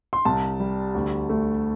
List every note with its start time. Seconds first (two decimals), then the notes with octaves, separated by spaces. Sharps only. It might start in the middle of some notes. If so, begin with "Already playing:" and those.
0.13 C6
0.25 C2 A5
0.60 G3
0.94 D2
1.29 A3